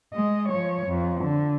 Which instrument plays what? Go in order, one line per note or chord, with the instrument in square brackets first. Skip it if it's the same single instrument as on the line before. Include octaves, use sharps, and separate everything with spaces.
[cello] G#3 D#5
F3 C#5
F2
D3